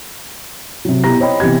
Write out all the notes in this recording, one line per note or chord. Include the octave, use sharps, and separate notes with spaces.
C3 F#3
B2 E4 G4 A#5 A#6
C5 C#5 D#5 G5 B5
C3 E3 B3 G4 G#6